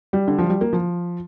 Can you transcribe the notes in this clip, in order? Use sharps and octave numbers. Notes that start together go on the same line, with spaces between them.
G3
D3
F3
G3
A#3
F3